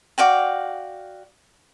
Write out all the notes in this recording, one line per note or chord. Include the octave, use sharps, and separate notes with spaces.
F#4 D5 F5 G5